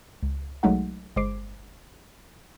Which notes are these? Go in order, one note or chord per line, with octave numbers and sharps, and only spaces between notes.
C#2
B1 F#3 G#3 A3 D#4 F#5
G1 G#3 C5 D6 C7 D7